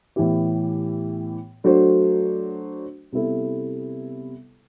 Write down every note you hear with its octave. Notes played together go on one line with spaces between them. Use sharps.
A2 E3 B3 E4 G4
F#3 A3 D4 F#4 C5
C3 G3 B3 E4 A4